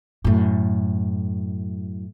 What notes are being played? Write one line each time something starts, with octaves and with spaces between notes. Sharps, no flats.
F#2 A2